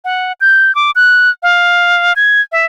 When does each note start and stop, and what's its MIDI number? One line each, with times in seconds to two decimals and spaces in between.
0.05 0.32 78
0.41 0.74 91
0.75 0.91 86
0.96 1.30 90
1.43 2.13 77
2.16 2.41 92
2.52 2.65 76